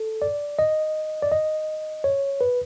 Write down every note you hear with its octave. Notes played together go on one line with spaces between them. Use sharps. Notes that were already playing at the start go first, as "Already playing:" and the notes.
Already playing: A4
D5
D#5
D5
D#5
C#5
B4